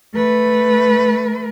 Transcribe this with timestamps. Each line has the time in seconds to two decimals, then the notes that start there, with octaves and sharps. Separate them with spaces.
0.14 A3 B4